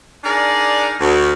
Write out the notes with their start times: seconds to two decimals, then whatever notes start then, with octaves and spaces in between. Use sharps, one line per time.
0.24 D4 D#4 G#4 A#4 D5
1.00 D2